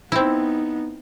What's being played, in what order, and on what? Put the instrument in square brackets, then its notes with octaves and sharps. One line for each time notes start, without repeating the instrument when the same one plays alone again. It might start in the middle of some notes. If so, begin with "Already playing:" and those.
[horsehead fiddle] B3 D#4 [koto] C4 E4